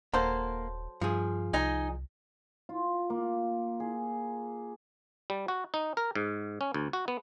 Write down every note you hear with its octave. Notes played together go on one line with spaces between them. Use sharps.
D#1 F#3 A#3 A4 C5
G2 F3 G#4
C2 D#4 D#5 G#5
F4
A#3
G#4
G3
F#4
D#4
A#4
G#2
C#4
D2
F#4
B3